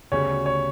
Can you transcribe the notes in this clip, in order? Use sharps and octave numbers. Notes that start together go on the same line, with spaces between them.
D2 C#3 G3 B3 F#4 C#5
C#5